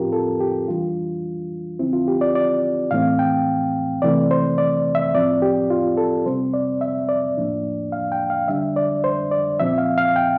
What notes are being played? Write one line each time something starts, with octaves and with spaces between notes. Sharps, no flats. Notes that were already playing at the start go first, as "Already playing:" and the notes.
Already playing: A2 F3 C4 F4 G4 A#4
A4
G4
E3 G3 D4 F4
D3 F3 C4 E4
F4
G4
D5
D5
A2 E3 A3 C4 F5
G5
C3 E3 A3 C4 D5
C5
D5
E5
A2 F3 C4 D5
G4
F4
A4
C3 G3 C4 C5
D5
E5
D5
A2 F3 A#3 D4
F5
G5
F5
D3 G3 D4 E5
D5
C5
D5
A#2 F3 C4 E5
F5
F5
G5